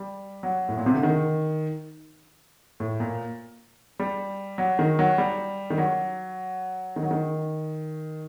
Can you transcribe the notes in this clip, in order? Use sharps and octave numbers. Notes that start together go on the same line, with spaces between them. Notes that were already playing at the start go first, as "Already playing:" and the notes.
Already playing: G3
F#3
A2
A#2
C3
D3
D#3
A2
A#2
G3
F#3
D#3
F#3
G3
D#3
F#3
D#3
F#3
D#3